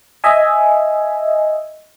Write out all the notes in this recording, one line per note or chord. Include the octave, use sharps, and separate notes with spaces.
D#5 E5 G#5